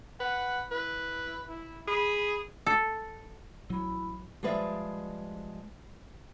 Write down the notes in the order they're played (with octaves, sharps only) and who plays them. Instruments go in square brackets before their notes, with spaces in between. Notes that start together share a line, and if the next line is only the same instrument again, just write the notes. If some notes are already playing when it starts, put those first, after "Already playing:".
[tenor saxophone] B4 [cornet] F#5
[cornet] E4 [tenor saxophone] B4
[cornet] E4
[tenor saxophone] G#4 [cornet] B5
[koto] A4
[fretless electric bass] A1 F#3 [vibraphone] E4 B5
[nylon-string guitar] F3 G3 G#3 B4 D5 E5